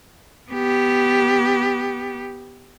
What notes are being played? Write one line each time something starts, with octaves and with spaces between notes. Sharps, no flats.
B3 G4